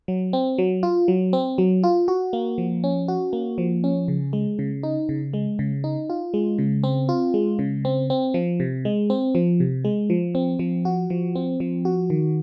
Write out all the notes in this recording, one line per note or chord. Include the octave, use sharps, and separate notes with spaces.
F#3
C4
F#3
F4
F#3
C4
F#3
F4
F#4
A#3
F3
C#4
F#4
A#3
F3
C#4
C#3
G#3
C#3
D#4
C#3
G#3
C#3
D#4
F4
G#3
C#3
C4
F4
G#3
C#3
C4
C4
F3
C3
G#3
C4
F3
C3
G#3
F3
C4
F3
F#4
F3
C4
F3
F#4
D#3